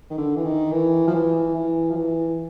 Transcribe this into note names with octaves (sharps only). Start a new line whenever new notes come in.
D#3
D3
E3
D#3
E3
F3
E3
E3
F3
E3